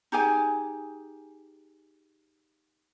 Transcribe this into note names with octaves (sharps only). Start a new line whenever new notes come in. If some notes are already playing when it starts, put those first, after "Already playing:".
D#4 G4 G#4 G#5